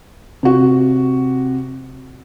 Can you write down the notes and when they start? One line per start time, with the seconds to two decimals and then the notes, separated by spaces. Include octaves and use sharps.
0.43 C3 F#4